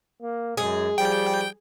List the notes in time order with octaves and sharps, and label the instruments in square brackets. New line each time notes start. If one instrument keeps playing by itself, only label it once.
[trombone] A#3
[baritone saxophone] F#2 [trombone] G#3 [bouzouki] G#4
[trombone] F3 [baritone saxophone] G3 [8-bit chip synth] G5